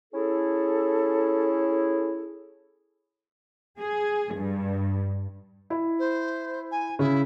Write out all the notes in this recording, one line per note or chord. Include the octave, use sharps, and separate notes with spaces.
C#4 E4 G#4 A4
G#4
G2
E4
C5
G#5
C#3 E4